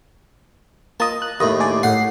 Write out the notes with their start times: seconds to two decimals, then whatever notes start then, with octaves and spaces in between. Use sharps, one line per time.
1.00 A#3 F4 D#5 A5
1.22 F#6
1.40 D#2 A2 D#5
1.60 D4 G#4 D5
1.83 A2 F#5 C7